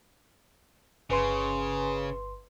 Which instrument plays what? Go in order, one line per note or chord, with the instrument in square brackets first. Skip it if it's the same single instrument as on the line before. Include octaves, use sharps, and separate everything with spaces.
[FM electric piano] G1 B4 C6 [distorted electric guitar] C#3